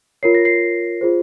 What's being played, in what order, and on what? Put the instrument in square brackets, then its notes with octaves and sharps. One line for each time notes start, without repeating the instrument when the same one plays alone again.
[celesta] F4 A#4 C#5 C7
A#6
C7
F4 G#4 C5